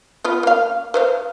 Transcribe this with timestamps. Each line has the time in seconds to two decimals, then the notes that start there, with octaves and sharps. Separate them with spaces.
0.24 B3 F4 B4
0.43 A#3 F5
0.94 B4 C5 F5